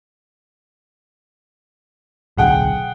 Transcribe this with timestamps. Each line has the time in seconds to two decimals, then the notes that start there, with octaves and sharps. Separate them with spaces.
2.37 D1 B1 D3 G#4 F#5 G5